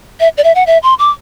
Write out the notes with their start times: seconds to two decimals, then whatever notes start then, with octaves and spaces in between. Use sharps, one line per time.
0.20 E5
0.37 D5
0.44 E5
0.55 F#5
0.67 E5
0.83 C6
0.99 D6